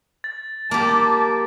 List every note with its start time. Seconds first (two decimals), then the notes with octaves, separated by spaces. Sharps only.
0.24 A6
0.71 A#3 G4 A5